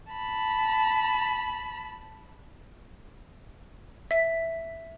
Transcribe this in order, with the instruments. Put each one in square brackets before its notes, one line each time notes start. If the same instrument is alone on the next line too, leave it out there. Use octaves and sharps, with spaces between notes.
[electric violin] A5 B5
[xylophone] E5 B6